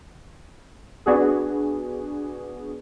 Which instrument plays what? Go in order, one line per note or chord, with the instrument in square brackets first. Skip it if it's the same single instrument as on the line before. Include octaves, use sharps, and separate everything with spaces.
[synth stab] B3 D4 F#4 G#4